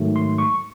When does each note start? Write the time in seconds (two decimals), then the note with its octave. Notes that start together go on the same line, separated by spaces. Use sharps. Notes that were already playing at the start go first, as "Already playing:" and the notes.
Already playing: G#2 D#3 F#3 A3
0.16 C6
0.38 C#6